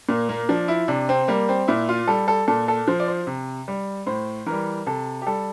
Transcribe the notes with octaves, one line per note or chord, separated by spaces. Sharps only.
A#2 A#3
A#3
F3 D4
E4
C3 D4
C4
G3 A#3
C4
A#2 E4
F4
G3 A4
A4
A#2 A4
A4
F3 C5
D5
C5
C3
G3
A2 C5
E3 A#4
G3
C3 A4
G4
G3 A4